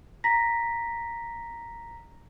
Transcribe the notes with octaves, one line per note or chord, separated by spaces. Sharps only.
A#5 A#6 B6